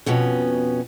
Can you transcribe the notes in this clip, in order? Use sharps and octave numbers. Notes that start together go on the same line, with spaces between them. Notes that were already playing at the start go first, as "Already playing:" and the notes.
F2 B2 B3 C#4